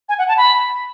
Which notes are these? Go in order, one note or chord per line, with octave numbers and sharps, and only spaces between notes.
G#5
F#5
A5
B5